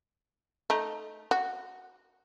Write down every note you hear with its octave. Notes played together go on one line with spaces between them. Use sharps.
A3 D#4
F#4